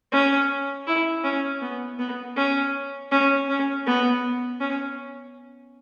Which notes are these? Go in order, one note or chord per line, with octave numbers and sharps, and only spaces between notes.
C#4
E4
C#4
B3
B3
C#4
C#4
C#4
B3
C#4